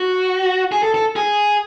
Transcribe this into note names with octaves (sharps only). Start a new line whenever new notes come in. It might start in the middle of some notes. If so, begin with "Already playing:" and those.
Already playing: F#4
G#4
A4
A4
G#4